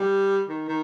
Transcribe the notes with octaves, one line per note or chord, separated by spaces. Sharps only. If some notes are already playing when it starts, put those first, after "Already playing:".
Already playing: G3
D#3
D#3